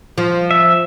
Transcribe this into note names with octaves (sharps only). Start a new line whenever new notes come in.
F3
E5